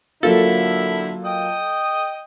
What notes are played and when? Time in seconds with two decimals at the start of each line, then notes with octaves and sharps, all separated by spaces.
0.23 D3 F#3 A#3 E4 F4 A4
1.25 D#5 G5 D#6